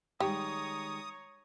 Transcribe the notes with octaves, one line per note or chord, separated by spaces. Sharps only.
D#3 G3 G#3 G4 C#5 A#5 D#6